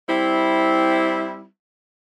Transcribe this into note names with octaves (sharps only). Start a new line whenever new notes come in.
G3 C4 E4